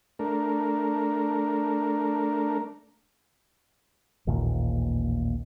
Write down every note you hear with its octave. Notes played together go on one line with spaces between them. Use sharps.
A3 D4 A#4
A1 D#2 A#2